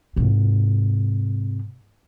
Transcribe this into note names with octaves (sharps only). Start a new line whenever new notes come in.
G#2 C3